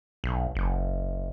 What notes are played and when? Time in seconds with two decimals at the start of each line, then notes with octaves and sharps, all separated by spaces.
0.24 B1
0.55 F#1